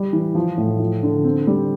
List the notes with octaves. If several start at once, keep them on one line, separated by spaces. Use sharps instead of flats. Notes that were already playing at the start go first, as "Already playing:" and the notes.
Already playing: G3
E3
F3
A2
F3
D3
C4
G3